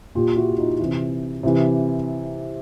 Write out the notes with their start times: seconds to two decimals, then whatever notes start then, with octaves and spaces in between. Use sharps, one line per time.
0.15 A#2 F4 G4
0.37 E4 F#4
0.58 D#4 F4
0.79 C3 E3
1.43 C3 E3